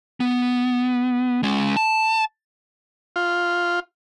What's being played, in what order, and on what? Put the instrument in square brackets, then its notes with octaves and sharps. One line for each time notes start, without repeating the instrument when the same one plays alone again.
[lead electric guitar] B3
G#3 C#4
A5
[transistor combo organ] F4